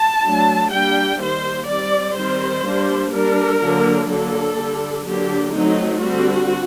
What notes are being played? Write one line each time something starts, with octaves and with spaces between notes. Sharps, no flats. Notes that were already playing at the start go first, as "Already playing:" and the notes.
Already playing: A5
F#3 A3 D4
G3 A#3 D4 G5
D#3 G3 A#3 C5
G3 C4 D5
D#3 G3 C4 C5
G3 A#3 D4
G3 D4 A#4
D3 F#3 A#3 D4
D3 F#3 A#3 D4 A4
D3 G3 D4
D3 F#3 A#3 D4 G4
F#3 A3 C4 D#4
D3 G3 C4 F#4